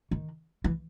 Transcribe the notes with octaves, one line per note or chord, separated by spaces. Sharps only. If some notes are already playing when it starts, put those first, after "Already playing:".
D#3
E3